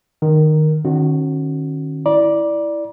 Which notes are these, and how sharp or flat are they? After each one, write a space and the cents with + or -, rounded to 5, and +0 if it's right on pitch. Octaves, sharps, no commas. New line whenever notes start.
D#3 -20 A#4 +0
D#3 -35 C#4 -30 F#4 +0
E4 +0 D5 +0 A#5 +35